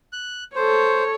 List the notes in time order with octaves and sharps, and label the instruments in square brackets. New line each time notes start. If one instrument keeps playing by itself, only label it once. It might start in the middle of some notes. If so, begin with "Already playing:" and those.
[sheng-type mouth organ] F#6
[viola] A4 C#5 [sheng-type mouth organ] C5